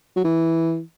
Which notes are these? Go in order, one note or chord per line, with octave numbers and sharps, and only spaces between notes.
F#3
E3